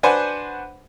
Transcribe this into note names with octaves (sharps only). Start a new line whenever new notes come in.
D4 F#4 B4 C5 F#5 G#5